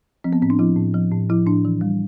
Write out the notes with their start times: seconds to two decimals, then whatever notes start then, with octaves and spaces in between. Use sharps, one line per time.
0.24 F3 C4
0.33 B3
0.42 A2 C4
0.50 D4
0.59 F3 E4
0.76 A2
0.94 F3
1.12 A2
1.30 F3 E4
1.47 A2 D4
1.65 E3
1.81 G3